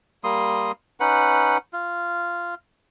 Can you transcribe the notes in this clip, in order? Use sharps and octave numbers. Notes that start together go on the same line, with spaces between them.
G3 A#3 C6 D#6
C#4 D#4 B4 F#5
F4